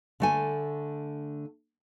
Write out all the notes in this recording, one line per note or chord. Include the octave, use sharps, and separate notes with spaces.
D3 A3 G#5